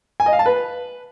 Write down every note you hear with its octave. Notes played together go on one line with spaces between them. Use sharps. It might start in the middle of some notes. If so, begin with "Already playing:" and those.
G#5
D#5
F5
A5
B4